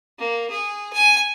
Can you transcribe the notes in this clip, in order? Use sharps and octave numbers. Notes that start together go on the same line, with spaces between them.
A#3
G#4
G#5